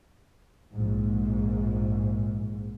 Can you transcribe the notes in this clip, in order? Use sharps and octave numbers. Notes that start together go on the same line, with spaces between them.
A#1 G#2